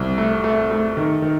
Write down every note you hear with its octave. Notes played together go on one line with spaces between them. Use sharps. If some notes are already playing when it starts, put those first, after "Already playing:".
Already playing: C2
A3
A3
A3
D#3
D#3